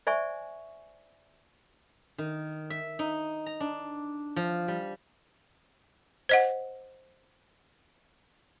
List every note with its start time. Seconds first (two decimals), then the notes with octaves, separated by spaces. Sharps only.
0.07 C5 D5 E5 G#5 C#6
2.18 D#3
2.70 E5
2.99 D#4
3.46 A#5
3.60 D4
4.36 F3
4.68 G3
6.29 C5 D#5 F#5